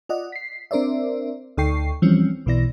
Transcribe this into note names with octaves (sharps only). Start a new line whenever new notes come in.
F4 D5 D#5 F#5
B6 C7
C4 D4 A#4 C5 D5 E5
D2 D#4 A4 G5 C#6 C7
E3 F3 G3 C4 C#4
B1 B2 E3 E4 D5 A#6